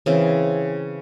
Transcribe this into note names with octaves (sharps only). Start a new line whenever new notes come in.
C#3 E3 C4